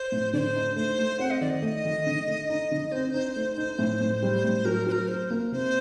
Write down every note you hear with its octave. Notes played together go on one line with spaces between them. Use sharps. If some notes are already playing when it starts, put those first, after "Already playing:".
Already playing: C5
A2
D3 C5 D5
D#4
A3 C5
A3
C4 F#5
D#5
D#3 D5
D#5
A3
D#3
D3
A3
D#4
D3
C4 C5
D#4
A3
D#4
A2
A2
G3
A2
F#3 A#4
F#3 C5
A#4
F#3 C5
A#3 A#4
C3 C5